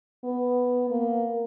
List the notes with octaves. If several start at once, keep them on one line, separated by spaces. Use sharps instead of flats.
B3
A#3